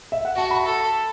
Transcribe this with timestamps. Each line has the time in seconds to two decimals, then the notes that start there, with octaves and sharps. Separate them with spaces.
0.12 E5
0.25 F#5
0.36 F#4 A5
0.51 B5
0.65 A4